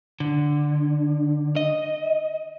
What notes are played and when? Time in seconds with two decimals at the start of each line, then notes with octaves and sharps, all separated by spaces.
0.20 D3
1.56 D#5